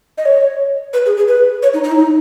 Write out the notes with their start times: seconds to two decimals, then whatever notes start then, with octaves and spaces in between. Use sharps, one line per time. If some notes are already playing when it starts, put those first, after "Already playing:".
0.18 D#5
0.25 C#5
0.93 B4
1.06 G#4
1.17 G#4
1.28 B4
1.62 C#5
1.74 D#4
1.84 D#4
1.91 E4
1.95 D#4